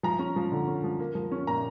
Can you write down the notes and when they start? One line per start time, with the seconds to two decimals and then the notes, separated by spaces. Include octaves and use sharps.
0.03 F3 A#5
0.19 C#4
0.36 F3
0.52 D3
0.67 C#4
0.84 F3
1.00 A#3
1.15 F3
1.32 C#4
1.47 A#2 A#5